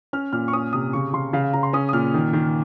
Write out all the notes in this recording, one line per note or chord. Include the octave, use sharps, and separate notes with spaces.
C#4 F6
A#2 F6
C#6
C#4 D#6
C3 D#6
C#3 C#6
C#3 C6
C#3 F5
F5
C#3 A#5
C6
C#4 D#6
D#6
A#2 F6
D#3
D#3